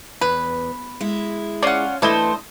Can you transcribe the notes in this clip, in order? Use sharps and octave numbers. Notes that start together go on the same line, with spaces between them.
E2 B4
G#3 E4
C#4 F4 D5 F#5
E3 A3 D4 E4 A4 C5 D#5